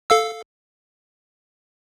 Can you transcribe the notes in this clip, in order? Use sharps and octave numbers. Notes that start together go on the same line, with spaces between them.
A4 F5 E6